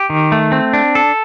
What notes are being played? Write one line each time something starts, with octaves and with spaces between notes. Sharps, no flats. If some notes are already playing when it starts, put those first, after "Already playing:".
Already playing: G4
D#3
A3
C4
D4
A4